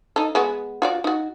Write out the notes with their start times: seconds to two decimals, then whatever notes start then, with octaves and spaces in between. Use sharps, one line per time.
0.16 D#4 A4
0.35 G#3 B3 F#4
0.82 F4 F#4 D5
1.04 D#4 F#4